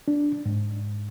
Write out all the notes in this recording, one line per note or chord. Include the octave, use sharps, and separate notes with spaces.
D4
G#2